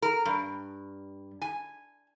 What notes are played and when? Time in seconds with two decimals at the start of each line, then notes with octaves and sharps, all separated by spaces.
0.02 A#4
0.25 G2
1.42 G#5